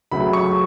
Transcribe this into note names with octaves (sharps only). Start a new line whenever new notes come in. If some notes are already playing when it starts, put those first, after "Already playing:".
C#2 C#3 F#3 A3 B5
C#6